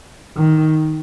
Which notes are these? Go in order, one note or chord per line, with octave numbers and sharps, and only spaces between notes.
D#3